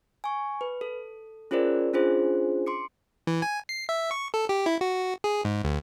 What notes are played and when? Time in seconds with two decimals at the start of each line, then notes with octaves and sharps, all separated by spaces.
0.24 G#5 C#6
0.61 B4
0.81 A4
1.51 C#4 F4 G#4 A#4 C5 D5
1.94 C#4 D4 F4 G#4 C5
2.66 C6 D6 C#7
3.27 E3
3.42 G#5
3.69 C7
3.89 E5
4.11 C#6
4.34 A4
4.49 G4
4.66 E4
4.81 F#4
5.24 G#4
5.45 G#2
5.64 D2